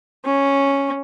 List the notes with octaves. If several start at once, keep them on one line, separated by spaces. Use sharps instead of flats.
C#4